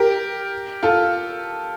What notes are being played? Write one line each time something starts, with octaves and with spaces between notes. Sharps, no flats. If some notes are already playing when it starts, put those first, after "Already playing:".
Already playing: G4 A#4
F4 A4